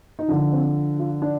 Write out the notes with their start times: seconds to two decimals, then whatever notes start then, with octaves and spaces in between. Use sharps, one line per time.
0.19 D#4
0.28 D3 F3 D4
0.52 C4
0.99 F4
1.22 D4